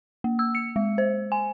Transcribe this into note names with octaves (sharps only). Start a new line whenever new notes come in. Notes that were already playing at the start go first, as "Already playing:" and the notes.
A#3
E6
C#7
G#3
C5
G#5